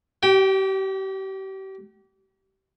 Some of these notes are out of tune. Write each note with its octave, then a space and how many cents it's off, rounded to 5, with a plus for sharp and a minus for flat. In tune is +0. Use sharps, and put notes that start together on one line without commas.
G4 -35 G5 +0